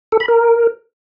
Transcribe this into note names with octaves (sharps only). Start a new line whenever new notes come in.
A4
B5
A#4